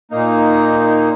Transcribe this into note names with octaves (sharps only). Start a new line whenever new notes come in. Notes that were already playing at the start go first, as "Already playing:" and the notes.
A#2 A#3 D#4